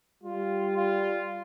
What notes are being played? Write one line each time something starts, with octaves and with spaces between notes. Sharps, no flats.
G3 F4
F4